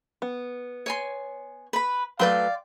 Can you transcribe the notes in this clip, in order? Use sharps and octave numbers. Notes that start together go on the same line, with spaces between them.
B3
C#5 G#5 C6
B4 B5
F#3 A3 B4 D5 F5 G5 C6